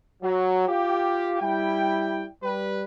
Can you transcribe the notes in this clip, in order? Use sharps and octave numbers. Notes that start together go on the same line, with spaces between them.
F#3
F4 G4
G3 E4 G5
G3 B4